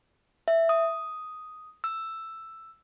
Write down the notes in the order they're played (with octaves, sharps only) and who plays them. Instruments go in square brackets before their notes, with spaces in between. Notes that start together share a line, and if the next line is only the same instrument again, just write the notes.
[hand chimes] E5
D#6
E6